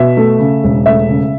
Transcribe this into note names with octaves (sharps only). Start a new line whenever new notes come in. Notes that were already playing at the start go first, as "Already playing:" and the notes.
Already playing: B2 E5
A3
C#3
E1
A3 E5
C#3